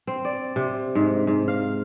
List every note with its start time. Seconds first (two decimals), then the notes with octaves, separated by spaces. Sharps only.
0.07 C4
0.25 D5
0.56 C3
0.95 G#2
1.27 G#2
1.48 F5